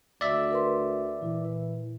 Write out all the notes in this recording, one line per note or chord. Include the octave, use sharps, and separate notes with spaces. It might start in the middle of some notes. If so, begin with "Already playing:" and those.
D2 D5 E5
A#4 B4 C6
A#2 E3